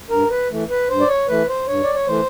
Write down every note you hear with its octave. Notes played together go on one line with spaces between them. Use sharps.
G2 A#4
B4
E3 A3
B4
G2 C5
D5
C#5
E3 A3 B4
C5
G2 C#5
D5
C#5
E3 A3 C5